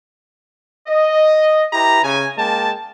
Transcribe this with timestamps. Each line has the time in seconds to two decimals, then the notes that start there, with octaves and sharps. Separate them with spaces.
0.88 D#5
1.71 E4 G4 B4 A#5
2.03 C#3 G#5
2.36 G#3 A#3 G5 A5